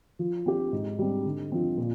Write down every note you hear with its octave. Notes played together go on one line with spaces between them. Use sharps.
F3
C4 G4
G#2
G3 C4
D3
F3 C4
A#2